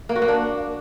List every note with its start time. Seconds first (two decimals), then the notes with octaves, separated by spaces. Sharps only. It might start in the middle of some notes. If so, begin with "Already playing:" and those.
0.09 A#3
0.16 F#4
0.22 A#3
0.28 D4